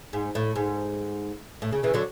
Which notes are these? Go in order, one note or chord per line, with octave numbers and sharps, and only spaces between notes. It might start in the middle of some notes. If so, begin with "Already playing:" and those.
G#2
A2
G#2
A2
C#3
C#3 E3
D3 F#3